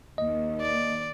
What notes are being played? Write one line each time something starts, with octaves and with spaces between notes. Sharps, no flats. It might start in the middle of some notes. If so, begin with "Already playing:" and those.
D#2 D#5
D5